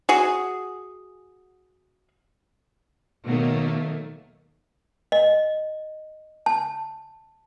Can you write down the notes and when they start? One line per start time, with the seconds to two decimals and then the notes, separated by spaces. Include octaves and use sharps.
0.09 F#4 G#4
3.25 B2 D#3 F#3 A3 A#3
5.12 D#5
6.46 A5